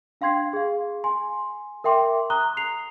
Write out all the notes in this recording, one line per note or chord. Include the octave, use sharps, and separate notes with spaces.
D4 F5 G5 C6 G#6 C7
G#4 F5
G#5 C6
A#4 E5 G5 C6 D6
A#5 D#6 F#6 G7
C7 F7